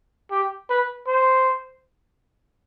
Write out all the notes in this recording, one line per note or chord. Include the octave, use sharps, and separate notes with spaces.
G4
B4
C5